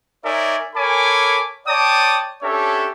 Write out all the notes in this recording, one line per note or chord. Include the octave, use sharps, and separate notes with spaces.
D#4 A#4 C#5 D5 E5 G#5
A4 A#4 C#5 G#5 B5 D6
C#5 D5 G5 A5 D6 D#6
C#4 D4 G4 A4 C#5 E5